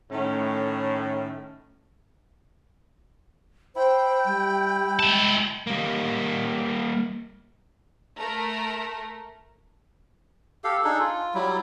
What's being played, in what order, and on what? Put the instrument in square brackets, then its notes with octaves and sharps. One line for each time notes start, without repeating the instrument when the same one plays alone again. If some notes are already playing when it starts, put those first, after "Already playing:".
[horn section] A2 [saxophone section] D#3 A3 C#4
[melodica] E4 [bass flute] C5 [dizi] G5
[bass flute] G3
[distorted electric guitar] G#3 A5
[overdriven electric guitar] G3 A#3
[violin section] A3 A#4
[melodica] G4 A4 F5
D4 D#4 G#4 A4
F4
F#3 G3 E4